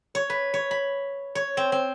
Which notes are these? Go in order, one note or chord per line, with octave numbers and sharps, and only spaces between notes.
C#5
B4
C#5
B5
C#5
C4
C4